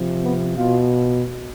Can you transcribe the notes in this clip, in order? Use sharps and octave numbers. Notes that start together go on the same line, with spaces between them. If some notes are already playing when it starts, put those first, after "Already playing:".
Already playing: C3 F3
B3
B2 F4